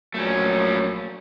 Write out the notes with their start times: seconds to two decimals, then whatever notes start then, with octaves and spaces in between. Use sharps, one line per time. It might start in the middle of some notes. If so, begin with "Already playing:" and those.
0.14 A#1 A#2 F#3 A3 C#4